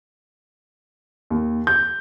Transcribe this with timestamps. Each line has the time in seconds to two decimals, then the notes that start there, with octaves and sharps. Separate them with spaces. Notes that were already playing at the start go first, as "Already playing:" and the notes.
1.30 D#2
1.67 G6